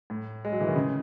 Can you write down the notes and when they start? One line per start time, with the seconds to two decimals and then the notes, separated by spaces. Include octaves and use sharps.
0.10 A2
0.45 G#3
0.52 F#3
0.61 E3
0.68 D#3
0.75 C#3